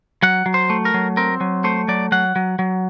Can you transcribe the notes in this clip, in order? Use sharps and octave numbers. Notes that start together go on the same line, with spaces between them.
F#3 F#5
F#3
C5
A3
A#4
F#3
C4 A#4
F#3
A3 C5
F#3 D5
F#3 F#5
F#3
F#3